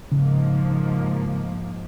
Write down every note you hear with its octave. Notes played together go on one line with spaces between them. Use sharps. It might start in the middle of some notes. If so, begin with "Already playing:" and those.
G#2 C#3 F3 A#3